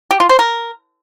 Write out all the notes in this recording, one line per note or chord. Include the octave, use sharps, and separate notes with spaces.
G4
F4
C5
A#4